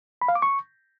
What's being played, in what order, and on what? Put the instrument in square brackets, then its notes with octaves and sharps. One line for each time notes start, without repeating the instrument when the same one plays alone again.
[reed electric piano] B5
F5
D6
C#6